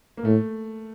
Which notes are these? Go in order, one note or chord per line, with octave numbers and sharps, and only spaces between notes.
A#3
A2 A3